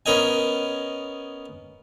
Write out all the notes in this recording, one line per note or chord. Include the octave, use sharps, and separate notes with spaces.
B3 C#4 A#4 D#5 G#5